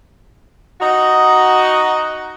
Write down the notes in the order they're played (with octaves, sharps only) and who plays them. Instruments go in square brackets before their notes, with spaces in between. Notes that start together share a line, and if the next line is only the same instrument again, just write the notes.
[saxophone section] D#4 F#4